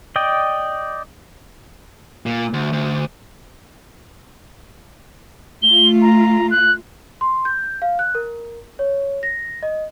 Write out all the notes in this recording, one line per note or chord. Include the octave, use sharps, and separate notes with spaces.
D5 D#5 G5
A#2
D2
D2
A3 F4 G7
A#5
F#6
C6
G6
F5
F#6
A#4
C#5
A#6
D#5